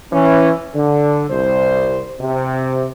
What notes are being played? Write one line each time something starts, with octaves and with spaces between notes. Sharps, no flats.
E3 C#4
D3
C2 C5
C3